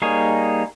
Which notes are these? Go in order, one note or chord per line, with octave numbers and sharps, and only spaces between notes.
G3 A#3 D#4 G#4 C#5